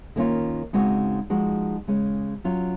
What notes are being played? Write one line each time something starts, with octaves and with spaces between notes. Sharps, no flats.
D#3 A#3 C#4 F4
C#3 G#3 C4 D#4 F#4
F3 G#3 D#4 F#4
C#3 G#3 C#4
F#3 C#4 F4